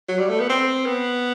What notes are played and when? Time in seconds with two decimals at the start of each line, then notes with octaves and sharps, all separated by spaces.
0.08 F#3
0.19 G3
0.29 A3
0.40 B3
0.50 C4
0.86 B3